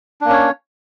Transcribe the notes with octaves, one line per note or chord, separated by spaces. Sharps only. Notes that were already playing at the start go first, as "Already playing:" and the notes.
A#3 C#4 D4 C#5